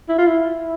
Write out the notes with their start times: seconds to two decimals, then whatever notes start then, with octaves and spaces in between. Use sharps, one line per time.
0.09 E4
0.18 F4
0.27 E4